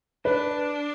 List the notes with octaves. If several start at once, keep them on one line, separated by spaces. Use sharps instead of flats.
D4 B4